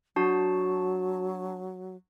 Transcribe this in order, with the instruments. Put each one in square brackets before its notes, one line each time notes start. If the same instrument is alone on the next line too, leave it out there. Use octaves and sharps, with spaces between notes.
[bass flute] F#3 [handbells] D4 F#4 A5